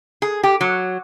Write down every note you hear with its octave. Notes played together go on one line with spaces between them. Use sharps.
G#4
G4
F#3